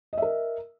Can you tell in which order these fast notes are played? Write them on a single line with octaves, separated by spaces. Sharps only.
D#5 E5 A#4